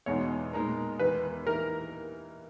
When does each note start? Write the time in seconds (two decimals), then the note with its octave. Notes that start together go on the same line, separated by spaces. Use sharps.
0.06 E2 B2 G#3 D#4 F#4 C#5
0.53 A#2 G#3 D#4 A#4
0.99 E2 D#3 G#3 B3 D#4 B4
1.46 E3 A#3 D#4 A#4